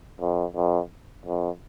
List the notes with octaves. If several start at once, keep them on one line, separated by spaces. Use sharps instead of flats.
F2
F2
F2